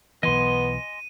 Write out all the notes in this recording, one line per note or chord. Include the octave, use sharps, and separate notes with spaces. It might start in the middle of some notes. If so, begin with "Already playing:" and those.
B1 E3 B3 D#5 G#5 C6 D#7